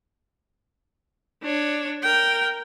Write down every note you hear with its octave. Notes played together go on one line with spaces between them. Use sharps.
D4 C#5
A#4 G5